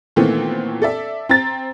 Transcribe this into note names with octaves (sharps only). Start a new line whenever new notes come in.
A#2 D#3 E3 A3 B3 C4
A4 D5 E5
C4 A#5 A6